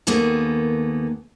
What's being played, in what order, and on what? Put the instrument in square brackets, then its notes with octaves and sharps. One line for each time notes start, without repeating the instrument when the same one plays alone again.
[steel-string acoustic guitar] D#2 D#3 A#3 B3 G#4 A4